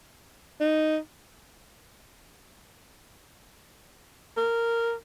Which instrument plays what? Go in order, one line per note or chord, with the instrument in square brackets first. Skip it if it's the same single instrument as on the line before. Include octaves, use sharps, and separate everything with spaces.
[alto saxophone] D#4
A#4